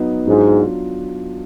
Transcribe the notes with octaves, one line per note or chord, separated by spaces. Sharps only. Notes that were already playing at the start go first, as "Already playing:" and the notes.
Already playing: F#3 B3 D#4
G#2 F#3 D4 F4